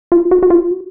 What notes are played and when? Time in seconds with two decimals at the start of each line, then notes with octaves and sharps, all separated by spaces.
0.12 F4
0.31 F#4
0.43 F#4
0.50 F4
0.71 F#4